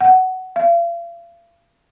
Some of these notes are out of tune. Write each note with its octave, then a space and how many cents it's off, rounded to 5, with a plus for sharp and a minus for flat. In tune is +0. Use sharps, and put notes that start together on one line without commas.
F#5 +15
F5 -40